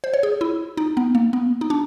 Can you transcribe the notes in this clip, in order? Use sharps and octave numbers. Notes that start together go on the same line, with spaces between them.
C5
C#5
G#4
E4
D#4
B3
A#3
B3
D#4
D4